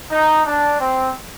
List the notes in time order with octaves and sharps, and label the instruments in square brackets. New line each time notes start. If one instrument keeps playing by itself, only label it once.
[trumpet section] D#4
D4
C4